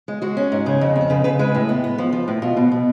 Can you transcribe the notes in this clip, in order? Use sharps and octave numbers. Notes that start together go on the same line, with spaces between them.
G#3
G#3 F#4
C#4
G#2
C#3 G#4
F2
F2
C#3 B4
C#3 B4
G#3 B4
A2
B3
B3
F3
F3
A2
B2 F4
B2
B2